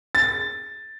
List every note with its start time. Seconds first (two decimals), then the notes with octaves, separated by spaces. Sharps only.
0.15 A6